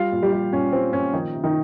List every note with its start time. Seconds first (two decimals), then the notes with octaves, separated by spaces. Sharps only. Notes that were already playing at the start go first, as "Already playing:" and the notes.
Already playing: G3 F4 F5
0.12 A#2
0.22 G3 G4
0.33 G3
0.53 A#2 C#4
0.73 G3 C4
0.93 A#2 C#4
1.13 D#3 F3 D#4
1.33 C3
1.43 D#3 D#4